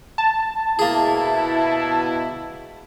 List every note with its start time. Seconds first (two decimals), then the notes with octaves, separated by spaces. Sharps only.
0.18 A5
0.79 B2 A#3 E4 G#4